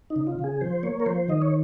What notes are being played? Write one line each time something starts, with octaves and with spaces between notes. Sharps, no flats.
D#4
C#3
F4
C#3
G#4
F3 C5
A#3 C#5
A#4
F3 C5
D#3 D#5
C#5